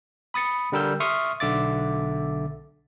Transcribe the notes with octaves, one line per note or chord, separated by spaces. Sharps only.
B5 D#6 A6 C#7
D3 G3 A#4 E6 G6
E5 C6 C#6 D#6 F6
B1 D3 E5 D6 A6